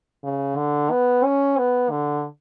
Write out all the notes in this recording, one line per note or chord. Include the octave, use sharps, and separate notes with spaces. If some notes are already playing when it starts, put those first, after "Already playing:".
C#3
D3
B3
C#4
B3
D3